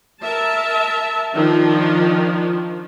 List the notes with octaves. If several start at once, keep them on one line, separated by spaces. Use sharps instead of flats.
A#4 E5 A5
D#3 F3 D4